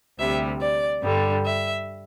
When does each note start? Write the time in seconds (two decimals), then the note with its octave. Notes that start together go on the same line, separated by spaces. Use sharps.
0.19 D2 C3 G3 E5
0.61 D5
1.03 G2 D3 G3
1.45 E5